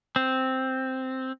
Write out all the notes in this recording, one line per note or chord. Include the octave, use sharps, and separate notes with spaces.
C4